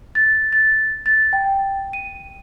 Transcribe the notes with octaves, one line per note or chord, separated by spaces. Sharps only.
A6
A6
A6
G5
D#7